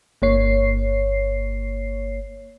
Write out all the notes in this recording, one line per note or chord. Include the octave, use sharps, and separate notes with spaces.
G1 A#3 C#5 C7